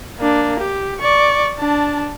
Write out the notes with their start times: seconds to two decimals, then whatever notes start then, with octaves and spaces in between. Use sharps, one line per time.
0.19 A#3 D4
0.60 G4
1.00 D5 C#6
1.57 D4 A5